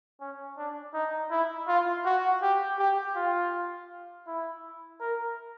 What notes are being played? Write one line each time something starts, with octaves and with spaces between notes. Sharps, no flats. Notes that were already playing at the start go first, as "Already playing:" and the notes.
C#4
D4
D#4
E4
F4
F#4
G4
G4
F4
E4
A#4